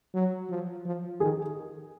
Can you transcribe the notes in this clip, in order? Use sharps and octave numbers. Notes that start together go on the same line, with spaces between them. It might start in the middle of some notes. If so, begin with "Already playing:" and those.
F#3
F3
F3
D#3 G#4